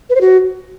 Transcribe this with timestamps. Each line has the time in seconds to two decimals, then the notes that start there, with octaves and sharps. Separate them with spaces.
0.10 B4
0.15 C5
0.21 F#4